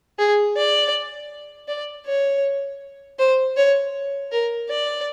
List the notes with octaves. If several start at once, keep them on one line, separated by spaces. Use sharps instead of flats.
G#4
D5
D5
C#5
C5
C#5
A#4
D5